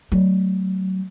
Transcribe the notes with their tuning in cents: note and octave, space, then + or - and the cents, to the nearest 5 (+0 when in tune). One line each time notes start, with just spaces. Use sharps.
F#3 +25 A3 +15